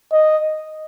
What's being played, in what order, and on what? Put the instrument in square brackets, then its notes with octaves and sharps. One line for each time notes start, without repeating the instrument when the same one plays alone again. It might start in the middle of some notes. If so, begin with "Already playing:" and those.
[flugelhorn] D#5